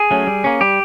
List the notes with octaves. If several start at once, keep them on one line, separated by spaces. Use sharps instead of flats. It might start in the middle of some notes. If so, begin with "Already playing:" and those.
Already playing: G#4
F#3 A3 C#4
G3
A#3 C#4
G3 G4